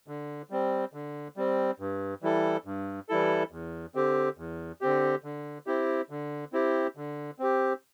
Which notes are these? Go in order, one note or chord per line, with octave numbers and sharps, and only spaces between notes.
D3
G3 C4
D3
G3 C4
G2
E3 G3 E4 A4
G2
E3 G3 E4 A4
E2
D3 C4 G4
E2
D3 C4 G4
D3
C4 E4 G4
D3
C4 E4 G4
D3
C4 G4